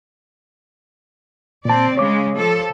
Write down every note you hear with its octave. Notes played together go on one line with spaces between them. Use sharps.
A#2 C4 D5 A5
C#3 G#3 C#5 D6
F3 A4